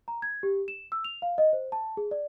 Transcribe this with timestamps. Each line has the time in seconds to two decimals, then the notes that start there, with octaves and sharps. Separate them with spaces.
0.08 A#5
0.22 G#6
0.43 G4
0.68 E7
0.92 E6
1.04 F7
1.22 F5
1.38 D#5
1.53 C5
1.72 A5
1.97 G#4
2.11 D5